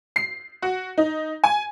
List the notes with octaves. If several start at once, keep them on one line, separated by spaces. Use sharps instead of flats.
C7
F#4
D#4
G#5